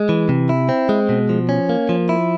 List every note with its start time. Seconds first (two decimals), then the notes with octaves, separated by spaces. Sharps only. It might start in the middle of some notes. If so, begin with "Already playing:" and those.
Already playing: G#3
0.09 E3
0.29 C3
0.49 E4
0.69 C4
0.89 G#3
1.09 B2
1.29 F3
1.49 C#4
1.69 A#3
1.89 F3
2.09 E4